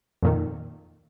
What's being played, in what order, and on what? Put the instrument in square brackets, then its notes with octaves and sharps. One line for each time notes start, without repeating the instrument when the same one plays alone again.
[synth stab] F2 A#2 D#3